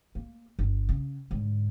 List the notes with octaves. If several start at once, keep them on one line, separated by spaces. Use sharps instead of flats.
A#3
G1
C#3
G#2 D3